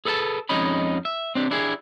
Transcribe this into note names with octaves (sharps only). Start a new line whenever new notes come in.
G#4 A4 B4 F5 A5
F2 G#3 C#4 D#4 D#5 B5
E5
C4 D4 G4
D4 E4 G4 G#4